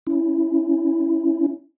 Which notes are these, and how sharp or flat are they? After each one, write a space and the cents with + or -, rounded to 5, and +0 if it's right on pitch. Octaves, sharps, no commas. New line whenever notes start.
C#4 +5 E4 +0